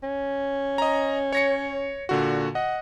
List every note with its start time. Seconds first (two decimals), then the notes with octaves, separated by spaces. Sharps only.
0.03 C#4
0.78 D#5 A#5
1.33 C#5 A#6 C#7
2.09 A#2 D3 F#4
2.55 D#5 F#5